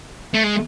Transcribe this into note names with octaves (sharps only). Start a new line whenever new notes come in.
A3
G#3